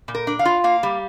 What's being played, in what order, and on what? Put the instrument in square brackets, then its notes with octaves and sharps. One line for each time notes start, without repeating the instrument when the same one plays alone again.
[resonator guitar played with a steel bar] A#2
A#4
D4
F5
F4
A#3 F5
G3